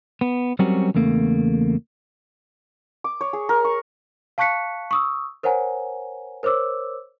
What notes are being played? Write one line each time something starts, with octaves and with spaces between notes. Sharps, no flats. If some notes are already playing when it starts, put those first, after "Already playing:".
B3
F#3 G3 C4 C#4 F#4 A#4
E2 C#3 A3 A#3
D6
C#5
G#4
A#4
C#6
F5 A5 C#6 F#6 B6 C#7
C#6 D#6 E6
A#4 C5 C#5 F#5 G#5 A#5
A#4 C5 C#5 D6 E6